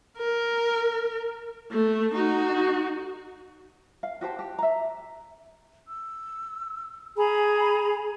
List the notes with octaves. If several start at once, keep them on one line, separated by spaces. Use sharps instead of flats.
A#4
A3
D#4 F#4
F5
F#4 G4 C5 A5
G4
E5 A#5
E6
G#4 G#5 A#5 B5